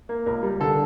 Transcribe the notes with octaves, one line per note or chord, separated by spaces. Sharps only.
A#3
C#2 A#4
G3
D3 A4